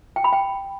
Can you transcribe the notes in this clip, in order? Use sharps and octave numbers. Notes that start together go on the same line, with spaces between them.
G5
B5
G5